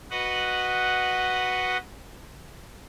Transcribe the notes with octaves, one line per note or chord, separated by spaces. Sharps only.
F#4 B4 D#5 F#5